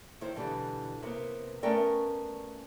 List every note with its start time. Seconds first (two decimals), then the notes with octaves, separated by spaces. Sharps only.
0.21 D#3 E4 C5
0.35 B2 D3 E3 G3 B3
1.02 C3 A#3 B3
1.63 A3 B3 C#4 A#4 D5 G5